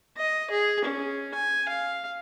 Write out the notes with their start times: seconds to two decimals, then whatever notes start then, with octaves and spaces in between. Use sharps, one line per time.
0.17 D#5
0.50 G#4
0.85 C#4
1.34 G#5
1.68 F5